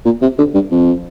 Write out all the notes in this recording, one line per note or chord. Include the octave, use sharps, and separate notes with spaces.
A#2
C3
D3
G2
F2